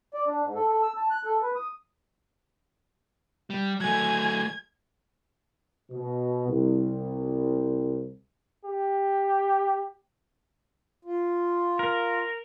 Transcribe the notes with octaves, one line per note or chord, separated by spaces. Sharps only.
D5
D4
G#2
A4
A4
E6
A5
F#6
A4
B4
D#6
G3
F#3 A3 G#5 G#6
B2
C2
G4
F4
A#4